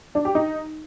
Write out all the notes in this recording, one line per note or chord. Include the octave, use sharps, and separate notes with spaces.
D4
G4
D#4